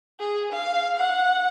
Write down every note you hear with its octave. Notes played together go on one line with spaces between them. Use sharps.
G#4
F5
F#5